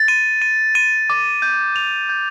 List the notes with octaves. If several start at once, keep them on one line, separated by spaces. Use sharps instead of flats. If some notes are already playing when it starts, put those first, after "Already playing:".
Already playing: A6
D#7
D#7
D#7
D6
G6
F7
G6